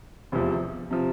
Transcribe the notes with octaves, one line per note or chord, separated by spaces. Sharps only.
F1 E2 C3 F3
C3 F3